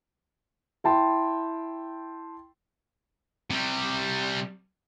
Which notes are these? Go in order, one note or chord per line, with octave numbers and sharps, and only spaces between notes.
E4 G5 A5 C6
C3 G3